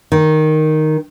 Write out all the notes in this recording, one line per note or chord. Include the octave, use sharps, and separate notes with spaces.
D#3